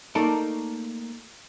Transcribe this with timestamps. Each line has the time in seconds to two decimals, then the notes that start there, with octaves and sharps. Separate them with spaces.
0.15 A3 A#3 D#4 A4 A#4 D5